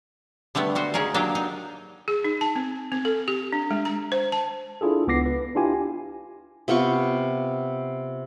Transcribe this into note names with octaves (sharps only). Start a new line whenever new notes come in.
D3 G3 A3 B3
G3 F#4 C5
C#3 C#4 D#4 G#4 A#4
F#3 A#3 D4 D#4 G4
D#4
G#4
D#4
A5
C4
C4
A4
G4
D4
G#3
A#5
C5
A5
D4 E4 F4 G#4 A4
C#2 B3 D6 A#6 C7
B4
D4 E4 F4 G4 G#5
C3 B3 F4 C#6